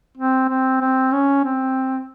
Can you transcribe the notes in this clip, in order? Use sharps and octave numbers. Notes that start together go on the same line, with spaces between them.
C4
C4
C4
C#4
C4